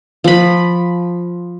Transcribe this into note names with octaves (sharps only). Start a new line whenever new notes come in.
F3 B5